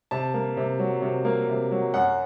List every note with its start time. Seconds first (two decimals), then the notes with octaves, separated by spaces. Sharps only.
0.11 C3 A5
0.34 A#3
0.57 C3
0.79 F#3
1.02 C3
1.25 A#3
1.48 C3
1.71 F#3
1.94 F#2 F#5